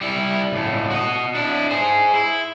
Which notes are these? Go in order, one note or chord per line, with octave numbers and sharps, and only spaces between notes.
G3 E4
C#2 A2
F#4 D#5
D4 E4
G#4 C5
E4